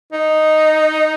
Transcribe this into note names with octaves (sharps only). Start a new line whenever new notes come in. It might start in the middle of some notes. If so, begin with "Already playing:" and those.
D#4